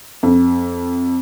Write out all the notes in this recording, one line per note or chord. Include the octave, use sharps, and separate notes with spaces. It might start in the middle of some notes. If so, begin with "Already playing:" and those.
F2